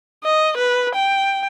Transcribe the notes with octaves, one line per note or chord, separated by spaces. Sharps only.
D#5
B4
G5